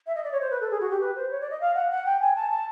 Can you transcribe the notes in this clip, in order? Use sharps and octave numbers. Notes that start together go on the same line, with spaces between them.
E5
D#5
D5
C#5
C5
B4
A4
G#4
F#4
G4
B4
C5
C#5
D5
D#5
F5
F#5
F#5
G5
G#5
A5
A5